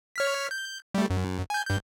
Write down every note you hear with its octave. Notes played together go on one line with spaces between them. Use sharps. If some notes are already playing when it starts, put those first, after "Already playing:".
C#5 F6 B6
G6
G3 A3
F#2
G#5 G6
G2 G6